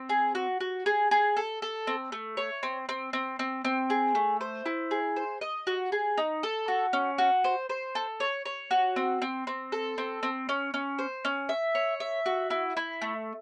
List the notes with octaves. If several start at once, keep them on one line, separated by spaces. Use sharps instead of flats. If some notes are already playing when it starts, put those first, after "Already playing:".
Already playing: C4
G#4
F#4
F#4
G#4
G#4
A4
A4
C4
A3
C#5
C4
C4
C4
C4
C4
G#4
A3
C5
E4
G#4
C5
D#5
F#4
G#4
D#4
A4
F#4
C#4
F#4
C5
C5
A4
C#5
C#5
F#4
C4
C4
C4
A4
C4
C4
C#4
C#4
C5
C#4
E5
C#5
E5
F#4
E4
E4
A3